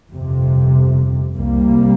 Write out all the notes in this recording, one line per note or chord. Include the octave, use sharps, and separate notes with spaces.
G1 F2 C3
C2 C3 G3 A#3